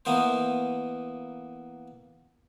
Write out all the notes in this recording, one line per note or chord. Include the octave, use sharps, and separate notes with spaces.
E3 A#3 B3 A#4 C5